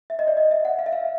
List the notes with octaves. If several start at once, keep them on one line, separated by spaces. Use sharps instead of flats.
E5
D#5
D5
D#5
E5
F#5
F5
E5
F5